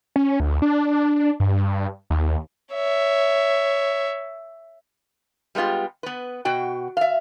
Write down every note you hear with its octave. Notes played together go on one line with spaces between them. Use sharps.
C#4
D2
D4
G2
D#2
C#5 E5
G3 G#3 B3 F4 G4
B3 B4
B2 F#4 G5
E5 F5